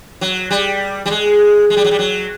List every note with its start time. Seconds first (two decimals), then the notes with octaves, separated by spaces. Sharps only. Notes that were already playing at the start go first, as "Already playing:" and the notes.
0.21 F#3
0.51 G3
1.06 G3
1.11 G#3
1.70 G#3
1.77 G3
1.84 F#3
1.91 G3
1.99 F#3